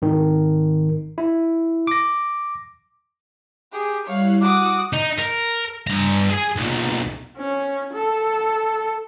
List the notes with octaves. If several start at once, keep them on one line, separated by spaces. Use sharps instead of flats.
G#1 D#3
E4
D6 A#6
G4 G#4
G3 E4 C#5 F5 F#6
F#4 D6 D#6 F#6
D#4
A#4
G2 A#5
G#4 G#5
B1 A#2
C#4
A4